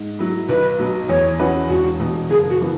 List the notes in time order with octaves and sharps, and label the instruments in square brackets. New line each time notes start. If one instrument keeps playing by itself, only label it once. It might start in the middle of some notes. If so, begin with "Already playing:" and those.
Already playing: [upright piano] G#2
F#3 E4
[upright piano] B1 [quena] B4
[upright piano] B2 F#3
[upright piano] E2 [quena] C#5
[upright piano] E3 C#4 F#4 B4
[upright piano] E1 [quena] F#4
[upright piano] E2 B2
[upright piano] F#1 [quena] G#4
[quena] F#4
[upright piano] E3 B3